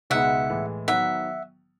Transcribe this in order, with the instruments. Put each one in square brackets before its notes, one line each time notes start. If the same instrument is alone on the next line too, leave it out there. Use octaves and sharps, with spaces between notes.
[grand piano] C#2 B2 G#3 B3 D#4 [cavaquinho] E5 F#5
[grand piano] A2 E3 G#3
[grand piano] D#3 F#3 B3 [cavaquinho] E5 F#5